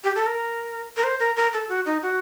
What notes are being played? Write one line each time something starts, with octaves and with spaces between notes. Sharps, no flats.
G4
A4
A#4
A#4
C5
A#4
A#4
A4
F#4
D#4
F#4